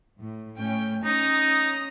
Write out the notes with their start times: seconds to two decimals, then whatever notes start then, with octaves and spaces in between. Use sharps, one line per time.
0.20 A2
0.57 A2 C#4 G5
1.05 C#4 D#4 A#5 D#6